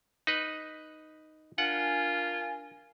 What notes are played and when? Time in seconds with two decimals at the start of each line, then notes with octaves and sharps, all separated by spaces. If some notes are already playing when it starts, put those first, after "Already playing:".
0.27 D#4 B4
1.58 D4 F4 A#4 F#5 G#5